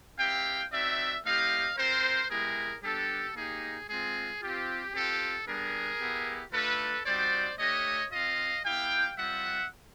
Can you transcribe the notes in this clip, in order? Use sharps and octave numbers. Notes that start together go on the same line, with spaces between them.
C4 E4 G4 F5 G5
C4 D#4 F#4 D5 E5
A3 C4 E4 G4 D#5 F5
C4 F4 A#4 C5
G#3 B3 E4 G4 G#4 A#4
G3 B3 D4 G4 A4
A#3 D#4 G4 G#4
G#3 C4 F4 G#4
C4 F4 G4
C4 F4 G4 A4
G3 B3 D4 G#4 A#4
B3 E4 G4
A3 D4 F4 A4 B4
G3 C4 D#4 F#4 C5 D5
A3 D4 G4 C#5 D#5
C4 F4 D#5 F5
B3 E4 G4 F5 G5
G3 C4 F4 E5 F#5